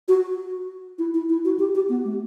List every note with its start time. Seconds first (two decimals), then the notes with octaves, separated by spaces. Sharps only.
0.08 F#4
0.98 E4
1.14 E4
1.29 E4
1.45 F#4
1.59 G4
1.75 G4
1.89 B3
2.05 A3